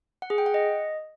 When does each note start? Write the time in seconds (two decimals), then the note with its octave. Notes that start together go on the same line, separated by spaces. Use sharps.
0.22 F#5
0.30 G#4
0.38 G5
0.46 F#5
0.54 D#5